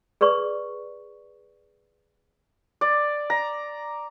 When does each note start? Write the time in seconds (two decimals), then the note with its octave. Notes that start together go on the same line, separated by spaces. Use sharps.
0.21 G#4 B4 D5 C#6
2.81 D5
3.30 A#5